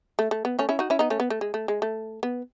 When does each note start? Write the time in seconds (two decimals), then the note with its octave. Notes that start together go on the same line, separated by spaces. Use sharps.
0.19 A3
0.31 A3
0.45 B3
0.59 A3 C#4
0.69 C#4 E4
0.79 D#4 F#4
0.90 C#4 E4
0.99 B3 D#4
1.10 A3 C#4
1.20 B3
1.30 A3
1.41 G#3
1.54 A3
1.68 G#3
1.82 A3
2.23 B3